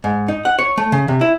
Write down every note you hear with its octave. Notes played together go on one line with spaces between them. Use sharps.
G#2
D#4
F#5
C#5
A3
C#3
C3
E4